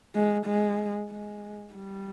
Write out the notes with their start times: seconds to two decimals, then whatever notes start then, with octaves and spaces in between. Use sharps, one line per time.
0.15 G#3
0.46 G#3
1.10 G#3
1.74 G3